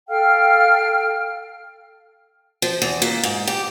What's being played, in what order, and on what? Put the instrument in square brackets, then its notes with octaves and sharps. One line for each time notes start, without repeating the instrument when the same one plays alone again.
[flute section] A4 F5 G5 F6
[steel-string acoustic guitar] F3
E2
A#2
G#2
G4